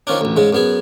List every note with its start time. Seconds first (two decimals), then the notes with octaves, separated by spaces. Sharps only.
0.07 D#3 F3 C#4 D4
0.21 A1 D2
0.36 G#2 C#3 G#3
0.53 F#2 B3 G#4